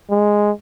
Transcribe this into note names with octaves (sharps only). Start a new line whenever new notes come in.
G#3